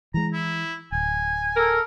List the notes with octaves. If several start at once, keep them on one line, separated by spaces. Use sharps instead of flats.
E3 G#3 A#5
E4
D1 G#5
A4 A#4